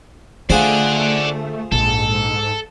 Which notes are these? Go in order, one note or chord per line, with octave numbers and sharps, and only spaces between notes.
D3 A3 F4 G#4 C5 D5 F#5
A#1 G#2 A4